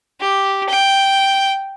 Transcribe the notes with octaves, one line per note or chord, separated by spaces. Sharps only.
G4
G5